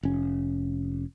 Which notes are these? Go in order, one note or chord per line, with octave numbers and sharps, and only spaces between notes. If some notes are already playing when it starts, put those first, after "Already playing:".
F1 C#4